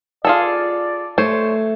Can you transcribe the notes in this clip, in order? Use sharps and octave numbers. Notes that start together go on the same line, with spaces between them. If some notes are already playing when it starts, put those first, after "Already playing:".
F4 G#4 A4 D5
A3 C5 C#5